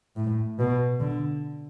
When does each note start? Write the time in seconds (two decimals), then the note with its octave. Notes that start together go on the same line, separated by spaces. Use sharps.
0.16 A2
0.59 B2
1.00 D3